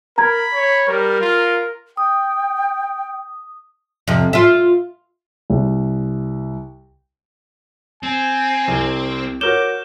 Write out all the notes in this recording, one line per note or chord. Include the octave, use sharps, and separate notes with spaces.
A#4 A#5 B5 G#6
C#5
G3 A#4
F4
G5 D#6
F2 C3
F4 E5
C2
C4 G#5
C2
F#4 A#4 C#5 D6 G6 E7 G7